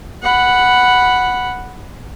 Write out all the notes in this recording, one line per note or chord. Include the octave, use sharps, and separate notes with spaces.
F#5 B5